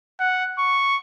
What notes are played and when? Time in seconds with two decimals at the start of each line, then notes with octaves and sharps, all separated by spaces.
0.19 F#5
0.59 C#6